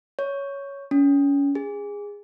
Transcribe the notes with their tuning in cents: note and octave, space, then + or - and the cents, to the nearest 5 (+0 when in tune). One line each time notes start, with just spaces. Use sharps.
C#5 +5
C#4 +25
G#4 -20